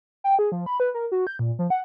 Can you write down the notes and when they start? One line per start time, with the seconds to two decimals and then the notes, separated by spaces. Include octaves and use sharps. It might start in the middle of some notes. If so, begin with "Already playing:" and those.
0.24 G5
0.39 G#4
0.52 F3
0.66 B5
0.80 B4
0.94 A#4
1.12 F#4
1.27 G6
1.39 A#2
1.59 F3
1.70 F#5